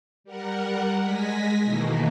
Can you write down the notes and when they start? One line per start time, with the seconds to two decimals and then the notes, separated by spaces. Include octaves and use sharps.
0.24 G3 A#4 F#5
1.02 G#3 G#5 A#6 B6
1.63 B2 D#3 E3 A3 A#3